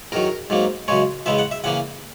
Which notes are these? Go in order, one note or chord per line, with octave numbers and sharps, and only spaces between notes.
E2 D#3 F#3 A#4
G#2 F#3 A#3
F#2 C#3 G#3 C#5
E2 C#3 G#3 B3 E5
F#5
E5
C#3 E3 A#3 F#5